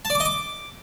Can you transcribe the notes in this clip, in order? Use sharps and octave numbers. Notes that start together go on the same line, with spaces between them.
A5
D5
D6
D#5
D6